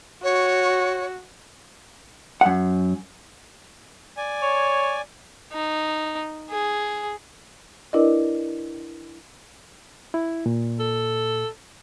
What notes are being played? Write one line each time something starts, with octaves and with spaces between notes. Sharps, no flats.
F#4 C#5
F#2 F#5
D5 G#5
C#5
D#4
G#4
D4 E4 A#4 B4 D5 D#5
E4
A#2
A4